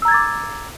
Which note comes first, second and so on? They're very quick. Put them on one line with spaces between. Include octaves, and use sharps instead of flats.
E6 A#5 G#6 A6 D6